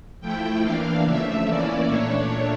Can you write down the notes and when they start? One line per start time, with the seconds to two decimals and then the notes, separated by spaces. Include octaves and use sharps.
0.21 F3 A3 E4 G5
0.62 E3 A#3 D4 F5
1.04 C#3 F3 A3 E5
1.46 E3 A#3 C#4 E4 D5
1.87 A#2 A3 D4 C#5